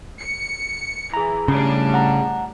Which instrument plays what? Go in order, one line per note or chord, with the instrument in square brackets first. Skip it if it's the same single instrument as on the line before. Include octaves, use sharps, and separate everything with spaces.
[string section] C#7
[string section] E3 [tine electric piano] G#4 A#5
[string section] A2 G3 D4 [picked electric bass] C#3
[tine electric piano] F#5 A#5